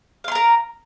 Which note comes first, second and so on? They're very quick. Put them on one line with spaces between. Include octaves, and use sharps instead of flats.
F5 C6 A#5 A#4